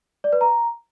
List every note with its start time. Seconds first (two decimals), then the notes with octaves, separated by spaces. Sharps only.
0.24 D5
0.33 B4
0.41 A#5